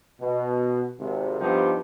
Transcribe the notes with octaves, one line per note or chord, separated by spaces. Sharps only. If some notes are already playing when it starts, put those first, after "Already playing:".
B2
G#1 C3
G2 F3 B3 D#4 G4